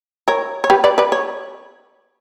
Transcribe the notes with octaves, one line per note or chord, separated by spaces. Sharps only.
A#4 C#5
C#5
G4 B4
B4 D5
B4 D5
C#5